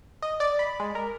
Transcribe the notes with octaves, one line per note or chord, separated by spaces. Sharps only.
D#5
D5
B5
G#3
A#4